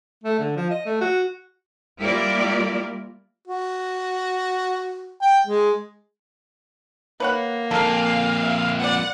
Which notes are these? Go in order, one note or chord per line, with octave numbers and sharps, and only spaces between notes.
A3
D3
F3
D#5
A3
F#4
G3 A#3 E4 F4 A#4 D5
F#4
G5
G#3
A#3 B4 C#5 F#5
F2 A#2 A4 A#4 F5
E5
B3 D5 F#5